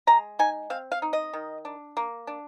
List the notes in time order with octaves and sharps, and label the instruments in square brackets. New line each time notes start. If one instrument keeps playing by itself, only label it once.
[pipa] G#3 A#5
D#4 G#5
C4 F5
F5
D#4
D#5
D#3
D4
A#3
D4